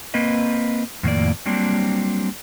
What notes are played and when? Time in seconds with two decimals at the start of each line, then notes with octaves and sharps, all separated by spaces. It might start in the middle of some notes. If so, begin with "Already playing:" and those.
0.14 A#3 C4 B4 D#5
1.03 F2 A2 D#3 A#3 D5
1.46 F#3 G3 A#3 C4 D4